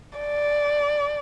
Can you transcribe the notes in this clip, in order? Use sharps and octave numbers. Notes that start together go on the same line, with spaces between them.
D5